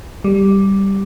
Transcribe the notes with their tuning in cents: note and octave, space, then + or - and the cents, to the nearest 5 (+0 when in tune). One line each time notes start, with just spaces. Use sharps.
G3 +0